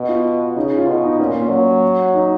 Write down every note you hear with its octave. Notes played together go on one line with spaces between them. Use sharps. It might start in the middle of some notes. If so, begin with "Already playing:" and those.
Already playing: B2
F4
C#3 D#4
F4
B2
D#4
A#2 C#4
A#3
C#4
F#3
D#4